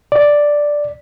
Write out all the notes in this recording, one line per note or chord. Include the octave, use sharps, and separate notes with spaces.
D5